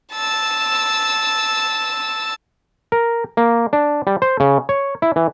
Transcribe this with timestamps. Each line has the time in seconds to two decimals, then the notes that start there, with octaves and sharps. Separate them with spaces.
0.13 A5 E6
2.92 A#4
3.37 A#3
3.73 D4
4.07 G3
4.22 C5
4.40 C#3
4.69 C#5
5.02 E4
5.16 E3